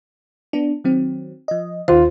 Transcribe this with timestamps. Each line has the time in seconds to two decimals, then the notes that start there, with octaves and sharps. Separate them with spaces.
0.53 B3 D4
0.84 D#3 F#3 C4
1.48 F3 D#5
1.88 D#2 D#3 F4 C5